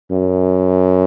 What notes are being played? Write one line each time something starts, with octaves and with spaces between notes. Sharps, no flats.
F#2